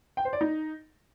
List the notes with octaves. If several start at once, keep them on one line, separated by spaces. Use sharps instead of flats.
G5
C5
D5
D#4